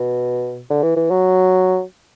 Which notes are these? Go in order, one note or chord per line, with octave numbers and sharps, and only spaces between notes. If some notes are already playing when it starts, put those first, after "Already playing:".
Already playing: B2
D3
E3
E3
F#3